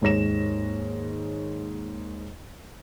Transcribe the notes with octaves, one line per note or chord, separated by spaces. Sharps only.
D#2 G#2 C#5 A#6 E7